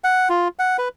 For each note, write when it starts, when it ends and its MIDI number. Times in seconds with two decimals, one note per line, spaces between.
0.04 0.29 78
0.29 0.48 65
0.59 0.77 78
0.78 0.88 71